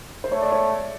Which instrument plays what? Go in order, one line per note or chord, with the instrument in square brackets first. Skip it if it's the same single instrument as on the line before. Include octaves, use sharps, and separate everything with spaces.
[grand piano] C5
[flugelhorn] A3 [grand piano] C#5
[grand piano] D5
C#5